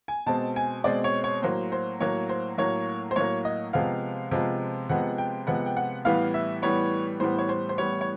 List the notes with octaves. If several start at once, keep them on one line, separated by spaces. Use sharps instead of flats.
G#5
B2 G#3 C4 A5
G#5
B2 G#3 C4 D5
C#5
C#5
A2 F#3 A#3 C5
C5
A2 F#3 A#3 C#5
C5
A2 F#3 A#3 C#5
C5
A2 F#3 A#3 C#5
D#5
C3 F3 G#3 B3 F5
C3 F3 G#3 B3
C3 F3 G#3 B3 F#5
G5
C3 F3 G#3 B3 F#5
G5
F#5
A2 E3 G3 B3 F5
E5
A2 E3 G3 B3 C#5
A2 E3 G3 B3 C5
C#5
C5
C5
A2 E3 G3 B3 C#5
C#5